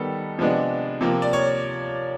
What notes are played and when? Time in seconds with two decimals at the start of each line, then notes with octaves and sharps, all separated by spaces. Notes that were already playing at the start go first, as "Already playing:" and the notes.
Already playing: D#3 G3 B3 A4
0.38 C3 F3 G#3 B3 D4
1.01 C3 F3 A#3
1.22 D5
1.33 C#5